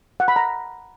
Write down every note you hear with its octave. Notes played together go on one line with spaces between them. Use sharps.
F#5
B5
A#5